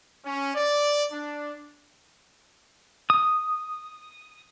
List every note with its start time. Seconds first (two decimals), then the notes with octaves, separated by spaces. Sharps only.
0.24 C#4
0.55 D5
1.12 D4
3.10 D#6